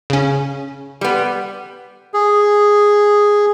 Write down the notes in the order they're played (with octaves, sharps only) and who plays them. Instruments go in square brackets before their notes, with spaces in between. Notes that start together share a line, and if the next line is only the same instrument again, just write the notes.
[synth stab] C#3 C#4
[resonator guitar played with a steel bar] G3 B3
[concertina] G#4